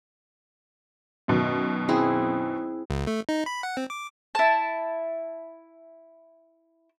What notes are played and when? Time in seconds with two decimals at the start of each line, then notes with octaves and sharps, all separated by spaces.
1.28 F#2 B2 D#3
1.89 C4 E4 G#4
2.90 C#2
3.07 A3
3.29 D#4
3.46 B5
3.63 F#5
3.77 C4
3.90 D6
4.35 E4 A5